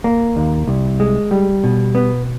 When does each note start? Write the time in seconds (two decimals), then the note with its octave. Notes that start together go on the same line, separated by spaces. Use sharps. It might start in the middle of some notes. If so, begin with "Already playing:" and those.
0.04 A#3
0.36 D#2
0.67 C2
1.00 G#3
1.31 G3
1.64 B2
1.95 B3